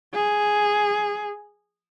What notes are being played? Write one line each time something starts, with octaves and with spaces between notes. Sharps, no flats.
G#4